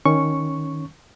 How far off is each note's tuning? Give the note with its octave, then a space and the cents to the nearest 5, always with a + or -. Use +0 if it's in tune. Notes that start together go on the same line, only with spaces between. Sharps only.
D#3 +0 C#4 +0 C#6 +0